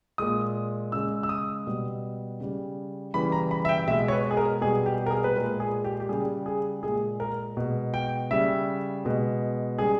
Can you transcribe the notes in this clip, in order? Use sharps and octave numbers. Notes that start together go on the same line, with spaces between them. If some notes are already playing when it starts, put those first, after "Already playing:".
A#2 G#3 D#6
C#3 G#3 E6
E6
D#6
B2 G3
C#3 G3
C#3 E3 G3 B5
A#5
B5
E5
G5
B2 G#3 E5
C#5
B4
G#4
A#4
B2 G3 G#4
G4
A#4
G#4
B4
A#2 G#3 A#4
G#4
G4
G4
C#3 G3 G#4
G#4
A#2 G#3 G#4
A#4
B2 G#3
G5
C#3 G3 E5
B2 G#3
C#3 G3 G#4